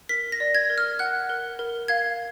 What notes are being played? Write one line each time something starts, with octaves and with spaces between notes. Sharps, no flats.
A#4 B6
A#6
D5
G#6
A#4
F6
F#5 F#6
A#4
A#4
F5 G#6